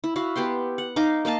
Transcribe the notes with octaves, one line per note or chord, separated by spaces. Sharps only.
E4
E4 F#4 F5
B3 G4 G5 C6
F#5
D#4 D#5 F5 D6
A#3 D#5 F5 A5